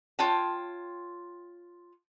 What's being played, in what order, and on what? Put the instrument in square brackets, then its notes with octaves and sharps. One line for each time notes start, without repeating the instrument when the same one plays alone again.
[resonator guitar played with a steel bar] F4 C#5 G5 A5